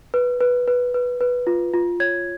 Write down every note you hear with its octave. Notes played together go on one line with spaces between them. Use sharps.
B4
B4
B4
B4
B4
F4
F4
C#5 G#6